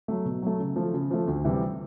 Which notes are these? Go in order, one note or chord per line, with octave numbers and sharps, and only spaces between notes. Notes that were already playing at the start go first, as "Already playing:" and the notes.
F#3 A3
B2
F#3 A3
C#3
F3 A3
C#3
F3 A3
D2
C3 E3 G3 C4